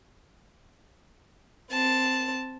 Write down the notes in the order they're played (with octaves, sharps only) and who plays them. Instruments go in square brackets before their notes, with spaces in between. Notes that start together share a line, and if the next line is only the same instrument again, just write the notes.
[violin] C4 A5